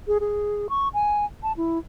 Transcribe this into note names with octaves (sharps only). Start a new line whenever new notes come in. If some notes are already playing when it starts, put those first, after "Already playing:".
G#4
G#4
C#6
G#5
A5
E4